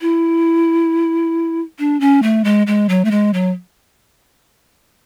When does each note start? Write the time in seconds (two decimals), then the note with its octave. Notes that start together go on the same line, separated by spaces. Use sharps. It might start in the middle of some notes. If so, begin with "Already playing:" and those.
0.01 E4
1.79 D4
2.00 C#4
2.23 A3
2.45 G#3
2.67 G#3
2.89 F#3
3.05 A3
3.11 G#3
3.34 F#3